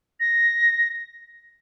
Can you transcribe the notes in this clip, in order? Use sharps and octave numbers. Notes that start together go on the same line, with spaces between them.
A#6